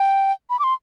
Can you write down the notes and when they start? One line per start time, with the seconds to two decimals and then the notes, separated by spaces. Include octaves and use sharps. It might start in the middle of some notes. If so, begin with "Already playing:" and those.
Already playing: G5
0.50 B5
0.59 D6
0.64 C6